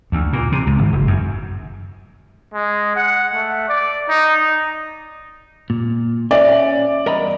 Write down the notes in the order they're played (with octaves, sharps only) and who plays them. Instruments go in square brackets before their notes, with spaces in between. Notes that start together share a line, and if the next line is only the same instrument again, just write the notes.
[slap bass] D2
A#2
C3
C#2
G#1
F#1
F#2
[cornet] G#3
F#5
A3
D5
D#4
[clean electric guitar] A#2
[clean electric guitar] C#4 [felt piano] D5 [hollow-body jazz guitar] E5
[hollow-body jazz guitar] E2 G2 D#5 [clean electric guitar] A#4 A#5 B5